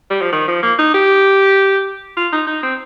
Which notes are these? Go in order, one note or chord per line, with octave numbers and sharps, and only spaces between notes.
G3
F3
D#3
F3
A#3
D#4
G4
F4
D#4
D#4
C4